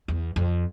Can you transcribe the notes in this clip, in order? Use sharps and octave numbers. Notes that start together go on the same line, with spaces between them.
E2
F2